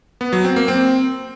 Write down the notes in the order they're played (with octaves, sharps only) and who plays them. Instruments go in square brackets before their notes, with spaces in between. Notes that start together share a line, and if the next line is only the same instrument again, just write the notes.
[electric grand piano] B3
F#3
C4
A#3
C4